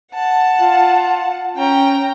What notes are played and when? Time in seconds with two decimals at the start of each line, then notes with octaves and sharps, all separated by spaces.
0.12 F#5 A5
0.61 F4
1.57 C#4 G5 A#5